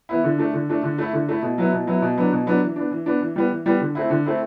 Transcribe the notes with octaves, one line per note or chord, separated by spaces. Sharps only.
E3 B3 E4
D3
A3 D4
D3
A3 D4
D3
A3 E4
D3
A3 E4
B2
F#3 B3 E4
B2
F#3 B3 E4
B2
F#3 B3 D4
B2
F#3 B3 D4
E3
B3 D4
E3
B3 D4
E3
G3 B3
E3
G3 B3
D3
A3 C4 E4
D3
A3 C4 E4